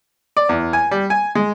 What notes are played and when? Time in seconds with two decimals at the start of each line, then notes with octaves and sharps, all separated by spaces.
0.37 D5
0.49 E2
0.73 G#5
0.91 G3
1.10 G#5
1.35 G#3